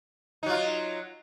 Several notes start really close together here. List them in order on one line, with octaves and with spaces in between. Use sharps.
D#4 F#3 F4